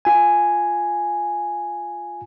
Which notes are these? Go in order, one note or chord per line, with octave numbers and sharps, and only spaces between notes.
F4 G#5